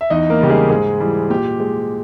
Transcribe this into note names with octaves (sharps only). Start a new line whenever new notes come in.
E5
E2 D#4 D#5
A#3 A#4
C#3 G3 G4
G#3 G#4
G#2 G#3 G#4
E3 G3
A#2 G4
G#3